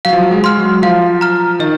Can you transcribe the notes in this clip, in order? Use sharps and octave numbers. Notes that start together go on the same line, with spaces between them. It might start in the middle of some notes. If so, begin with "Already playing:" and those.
F#3 F5
F3
F#3
G#3
C6 F6
F#3
F3 F5
A#5 F6
D#3 D#5